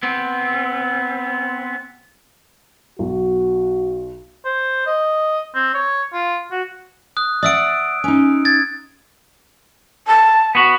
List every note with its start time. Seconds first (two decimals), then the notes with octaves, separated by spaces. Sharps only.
0.03 B3 C4
2.99 B1 F#4
4.45 C5
4.86 D#5
5.55 C4
5.74 C#5
6.13 F4
6.51 F#4
7.17 D#6 F#6
7.43 D5 E5 F#5 D#6 E6 D7
8.04 C#4 D#4
8.45 G#6 A6
10.07 A5
10.55 B3 F#4